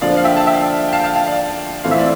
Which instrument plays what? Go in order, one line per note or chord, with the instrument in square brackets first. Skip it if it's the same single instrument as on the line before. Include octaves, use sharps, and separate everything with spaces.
[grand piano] D3 F3 A#3 D4 [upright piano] D5 F5
[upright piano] F5
E5 G5
A5
E5 G5
G5
F5 A5
G5
F5 A5
F5 A5
D5 F5
[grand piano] E3 A3 C4 F4 [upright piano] F5
[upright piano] E5
D5